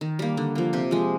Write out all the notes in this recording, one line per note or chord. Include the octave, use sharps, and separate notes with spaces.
D#3
G3 A#3
D3
F3 A#3
C3 G4
F3 G#3